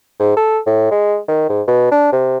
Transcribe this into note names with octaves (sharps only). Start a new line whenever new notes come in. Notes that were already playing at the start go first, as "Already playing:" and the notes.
G#2
A4
A2
G#3
D#3
G#2
B2
D4
C3